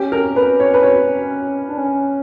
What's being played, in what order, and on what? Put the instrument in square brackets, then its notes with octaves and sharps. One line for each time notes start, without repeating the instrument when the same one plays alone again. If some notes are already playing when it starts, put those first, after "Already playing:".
Already playing: [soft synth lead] C#4 [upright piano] G4
[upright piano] A#4
B4
C#5
B4
C#5
[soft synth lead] D4
C#4